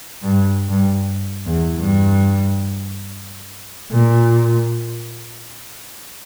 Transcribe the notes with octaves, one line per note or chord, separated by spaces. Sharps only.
G2
G2
E2
G2
A#2